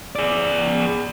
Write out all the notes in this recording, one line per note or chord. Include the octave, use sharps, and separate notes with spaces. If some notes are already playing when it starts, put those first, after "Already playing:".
G#4 D5